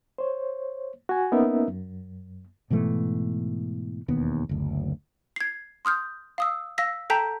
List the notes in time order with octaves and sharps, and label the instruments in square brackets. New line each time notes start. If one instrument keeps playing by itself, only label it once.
[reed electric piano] C5 C#5
F#4 G#5
A#3 B3 C#4 D#4 A#4 E5
F#2
[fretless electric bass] G#2 B2 E3 A3
E1 D#2 B3
F#1 D2
[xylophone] G#6 C7
C6 D#6 F6 G6
F5 D#6 E6
F5 E6 A#6 B6
A4 G5 A5 A#5 G6 B6